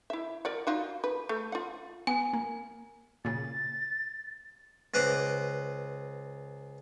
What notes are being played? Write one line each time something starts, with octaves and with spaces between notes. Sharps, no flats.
E4 E5
A#4 D5 F#5
D#4 F4 F#4
B4
A3
F4 F#5
B3 G#5
A#3
A#2 C#3 A6
C#2 B4 C5 A#5 D6